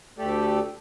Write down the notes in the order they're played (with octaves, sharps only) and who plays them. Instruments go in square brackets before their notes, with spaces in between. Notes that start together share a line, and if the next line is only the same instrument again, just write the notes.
[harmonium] D2 A3 G4 A4 D5